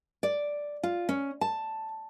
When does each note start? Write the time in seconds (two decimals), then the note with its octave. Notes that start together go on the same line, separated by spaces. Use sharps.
0.23 D5
0.83 F4
1.09 C#4
1.41 A5